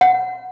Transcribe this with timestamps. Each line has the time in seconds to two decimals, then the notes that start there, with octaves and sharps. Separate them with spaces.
0.01 F#5